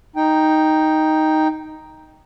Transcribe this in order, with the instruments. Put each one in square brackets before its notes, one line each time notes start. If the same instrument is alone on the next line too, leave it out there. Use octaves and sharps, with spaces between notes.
[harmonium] D#4 G5